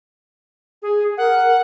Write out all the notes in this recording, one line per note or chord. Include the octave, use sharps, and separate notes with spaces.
G#4
A#4 F#5